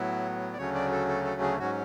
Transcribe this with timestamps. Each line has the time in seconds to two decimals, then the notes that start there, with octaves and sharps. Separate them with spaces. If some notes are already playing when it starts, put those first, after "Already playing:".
Already playing: A2 F#3 B3 E4
0.53 D5
0.58 D2 C#3 F#3 A3 C#4 C#5
0.75 D5
0.92 A4
1.08 A4
1.25 A4
1.41 G#4
1.59 G#2 F#3 C#4 F#4